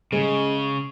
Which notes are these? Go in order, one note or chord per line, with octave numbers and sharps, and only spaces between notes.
C#3 G#3